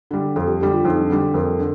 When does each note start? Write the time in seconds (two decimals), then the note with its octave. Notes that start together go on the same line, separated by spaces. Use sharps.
0.11 D3 G3
0.36 F2 A4
0.48 G4
0.60 D3 G3 G4
0.73 F4
0.85 F2 D#4
1.01 D4
1.10 D3 G3
1.34 F2 A#4
1.59 D3